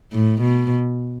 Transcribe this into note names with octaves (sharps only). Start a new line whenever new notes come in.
A2
B2